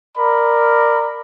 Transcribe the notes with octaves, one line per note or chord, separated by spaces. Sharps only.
A#4 D5 B5